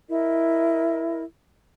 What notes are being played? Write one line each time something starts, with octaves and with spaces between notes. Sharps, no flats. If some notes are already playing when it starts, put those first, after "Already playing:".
E4 A#4 D#5